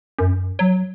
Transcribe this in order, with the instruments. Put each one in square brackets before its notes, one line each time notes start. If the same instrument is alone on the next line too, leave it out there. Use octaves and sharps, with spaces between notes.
[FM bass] F#2
F#3